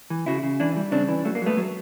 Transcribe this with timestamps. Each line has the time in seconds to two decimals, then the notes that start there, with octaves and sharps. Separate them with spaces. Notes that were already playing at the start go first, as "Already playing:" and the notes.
0.10 E3
0.26 C#3 E4 F#4
0.43 C#3
0.60 E3 D4 E4
0.76 G3
0.91 C#3 C4 D4
1.09 E3
1.25 F#3 A3
1.35 A#3
1.42 F#3 A3 B3
1.57 F#3